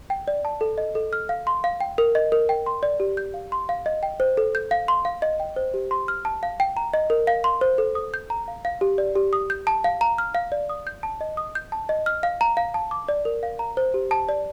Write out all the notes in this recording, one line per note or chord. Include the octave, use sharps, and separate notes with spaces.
G5
D5
A5
A4
D#5
A4
F6
F5
C6
F5
G5
A#4
D#5
A#4
G5
C6
D5
G4
G6
F5
C6
F5
D#5
G5
C5
A4
G6
F5
C6
F5
D#5
G5
C5
G4
C6
F6
A5
F5
G5
A#5
D#5
A#4
F5
C6
C5
A4
D#6
G6
A#5
F5
F5
G4
D5
G4
D#6
G6
A5
F5
A#5
F6
F5
D5
D#6
G6
A5
D#5
D#6
G6
A5
D#5
F6
F5
A#5
F5
A5
D6
D5
A#4
F5
A#5
C5
G4
A5
D5